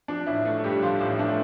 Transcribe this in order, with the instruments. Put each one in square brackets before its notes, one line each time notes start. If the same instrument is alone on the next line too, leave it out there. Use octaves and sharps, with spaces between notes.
[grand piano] F3 [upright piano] D4
[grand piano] A1 [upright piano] E4
[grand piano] A3
[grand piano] G2 [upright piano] G4
[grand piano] F3 [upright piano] F4
[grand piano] A1
[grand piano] A3 [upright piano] D4